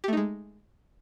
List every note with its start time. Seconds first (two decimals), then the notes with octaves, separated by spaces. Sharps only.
0.04 G4
0.08 A3
0.13 D#4
0.17 G#3